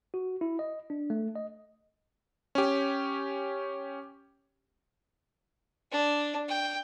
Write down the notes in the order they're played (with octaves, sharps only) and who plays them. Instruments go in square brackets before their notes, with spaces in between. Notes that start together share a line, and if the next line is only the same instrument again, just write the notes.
[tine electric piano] F#4
E4
D#5
D4
A3
D#5
[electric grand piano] C#4 G4
[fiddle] D4
G5